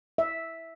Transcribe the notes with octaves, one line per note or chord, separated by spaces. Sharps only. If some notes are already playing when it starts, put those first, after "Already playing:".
E5